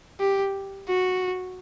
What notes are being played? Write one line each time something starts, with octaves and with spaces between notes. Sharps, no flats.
G4
F#4